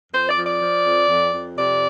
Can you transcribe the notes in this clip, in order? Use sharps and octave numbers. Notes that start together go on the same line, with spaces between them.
F2 C5
D5
F3
D5
F3
F2
F2
F2
C3 D5